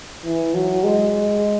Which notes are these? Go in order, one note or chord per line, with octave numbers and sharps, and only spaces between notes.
E3
F#3
G#3